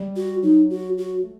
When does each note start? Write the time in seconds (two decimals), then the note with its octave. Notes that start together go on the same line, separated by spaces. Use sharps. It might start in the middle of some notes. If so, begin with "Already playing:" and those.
Already playing: G3
0.16 F#4
0.43 F#3 D#4
0.70 F#4
0.98 F#4
1.24 A3